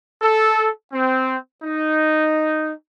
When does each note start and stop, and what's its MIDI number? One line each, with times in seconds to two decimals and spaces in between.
0.21 0.69 69
0.92 1.36 60
1.62 2.72 63